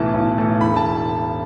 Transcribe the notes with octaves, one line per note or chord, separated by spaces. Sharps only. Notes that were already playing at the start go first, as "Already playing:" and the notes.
Already playing: B1 A2 E3 A3 A5
B1
A2 E3 A3
E1 B5
A5